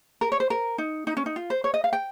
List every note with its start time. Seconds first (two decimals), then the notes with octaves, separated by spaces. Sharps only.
0.21 A#4
0.32 C#5
0.40 C5
0.50 A#4
0.78 D#4
1.07 D#4
1.17 C#4
1.26 D#4
1.36 F4
1.50 C5
1.64 C#5
1.74 D#5
1.84 F5
1.93 G5